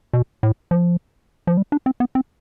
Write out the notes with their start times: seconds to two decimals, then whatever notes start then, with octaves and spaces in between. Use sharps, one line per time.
0.13 B2
0.43 A2
0.71 F3
1.47 F3
1.57 G3
1.72 D4
1.86 C4
2.00 B3
2.15 C4